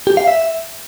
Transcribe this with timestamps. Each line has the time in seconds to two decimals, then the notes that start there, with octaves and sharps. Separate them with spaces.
0.07 G4
0.17 F5
0.27 E5